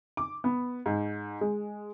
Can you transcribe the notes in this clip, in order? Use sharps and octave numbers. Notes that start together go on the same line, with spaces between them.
D6
B3
G#2
G#3